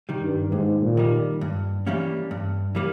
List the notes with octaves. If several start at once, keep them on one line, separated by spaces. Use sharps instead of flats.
D#3 G3
G2
D#2 G#2
A#2
D#3 G3
G2
E3 G3 A#3 C#4
G2
E3 G3 A#3